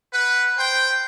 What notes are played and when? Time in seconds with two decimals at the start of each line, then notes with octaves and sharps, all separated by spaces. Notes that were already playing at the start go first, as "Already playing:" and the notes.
0.13 B4 F#5
0.58 C5 G5